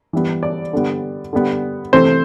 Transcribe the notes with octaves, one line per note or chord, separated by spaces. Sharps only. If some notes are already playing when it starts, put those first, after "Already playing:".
E3 G3 B3
D5
D3 G3 B3
D3 G3 B3
C3 E3 A3 C4 C5